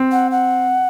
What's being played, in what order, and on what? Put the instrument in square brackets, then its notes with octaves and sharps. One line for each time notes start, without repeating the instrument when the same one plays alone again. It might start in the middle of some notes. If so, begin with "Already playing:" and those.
Already playing: [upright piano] C4
[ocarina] F#5
F#5